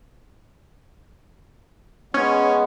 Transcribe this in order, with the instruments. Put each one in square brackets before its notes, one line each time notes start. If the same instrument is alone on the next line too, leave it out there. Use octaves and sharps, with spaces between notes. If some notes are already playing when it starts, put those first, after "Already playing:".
[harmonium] G#3 B3 [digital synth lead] C#4